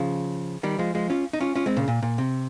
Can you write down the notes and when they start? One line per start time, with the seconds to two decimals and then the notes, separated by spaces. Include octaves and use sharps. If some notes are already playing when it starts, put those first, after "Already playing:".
Already playing: C#3 F3
0.63 D#3 G3
0.79 F3 G#3
0.95 F3 G#3
1.10 C#4 F4
1.33 D#4
1.40 C#4 F4
1.55 C#4 F4
1.66 G#3 C4
1.77 A#2 C#3
1.88 A#2
2.03 A#2
2.18 C3